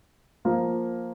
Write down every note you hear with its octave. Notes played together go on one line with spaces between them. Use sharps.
F3 A#3 F4